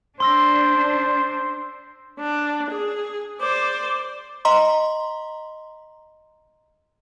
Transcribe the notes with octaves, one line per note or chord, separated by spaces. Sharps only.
D4 C5 C6 E6 A#6
D4
G#4
C5 D5 D6
D#5 A#5 C6